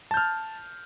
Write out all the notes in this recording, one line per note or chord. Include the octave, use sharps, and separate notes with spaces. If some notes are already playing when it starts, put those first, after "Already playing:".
A5 F6 G6